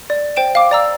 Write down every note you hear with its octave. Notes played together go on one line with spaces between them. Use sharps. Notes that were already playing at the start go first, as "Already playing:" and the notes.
D5
C5 G5 D7 E7
F5 D6
D5 A#5 E6